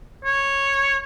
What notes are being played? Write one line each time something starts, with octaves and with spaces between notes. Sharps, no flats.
C#5